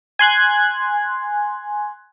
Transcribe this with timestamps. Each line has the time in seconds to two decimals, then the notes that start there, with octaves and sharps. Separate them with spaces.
0.19 G#5 C6 F#6 G#6